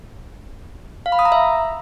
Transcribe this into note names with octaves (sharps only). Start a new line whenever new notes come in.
F5
B5
D#6
A#5
E5